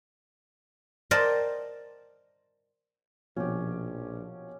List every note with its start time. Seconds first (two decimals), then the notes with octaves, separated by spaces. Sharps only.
1.11 A#4 C5 D5 D#5 G5 A5
3.36 A#1 B2 F3 C#4 G4